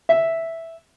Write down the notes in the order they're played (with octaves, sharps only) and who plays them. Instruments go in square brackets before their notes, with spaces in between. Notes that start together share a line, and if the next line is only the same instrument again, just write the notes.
[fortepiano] E5